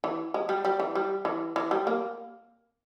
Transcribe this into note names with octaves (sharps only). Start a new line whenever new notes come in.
E3
G#3
G3
G3
E3
G3
E3
E3
G3
A#3